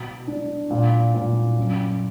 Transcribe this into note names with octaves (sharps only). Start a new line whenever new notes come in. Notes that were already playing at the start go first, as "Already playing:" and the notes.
Already playing: B2
D4
A#2
A#2
F#2